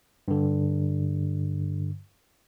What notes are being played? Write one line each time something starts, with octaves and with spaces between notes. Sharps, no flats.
G2 D3